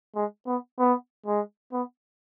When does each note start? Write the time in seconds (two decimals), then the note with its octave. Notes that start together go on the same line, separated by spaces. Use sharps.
0.16 G#3
0.47 B3
0.79 B3
1.26 G#3
1.73 B3